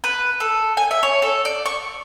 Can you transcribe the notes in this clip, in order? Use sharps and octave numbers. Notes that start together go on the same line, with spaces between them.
B4
A4
G#5
E5
C#5
A4
D5
C#6